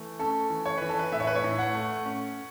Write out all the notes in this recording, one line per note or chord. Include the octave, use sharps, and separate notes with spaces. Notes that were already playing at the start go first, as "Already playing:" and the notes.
Already playing: E3 A3
C#4 A4
E3
C#5
E3 B4
A4
B4
A2 E5
C#5
B4
C#5
A2
F#5
A3
C#4